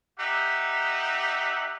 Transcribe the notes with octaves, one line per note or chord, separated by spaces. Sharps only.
D#4 G4 E5 F#5